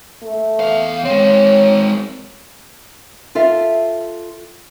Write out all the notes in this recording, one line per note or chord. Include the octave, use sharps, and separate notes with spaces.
A3
E2 F5
G#3 C4 C#5
F4 A4 E5 F5